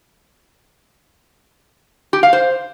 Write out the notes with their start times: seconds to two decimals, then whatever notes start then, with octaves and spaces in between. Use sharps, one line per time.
2.13 G4
2.23 F5
2.33 C5